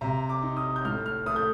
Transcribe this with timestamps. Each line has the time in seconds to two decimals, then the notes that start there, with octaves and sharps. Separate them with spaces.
0.01 C3 A#5
0.29 D6
0.43 D#4
0.57 D#6
0.76 G6
0.85 A2 F6
1.06 F6
1.26 A3 D#6
1.36 G6